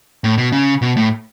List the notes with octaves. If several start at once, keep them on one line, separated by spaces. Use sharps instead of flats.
A2
B2
C#3
B2
A2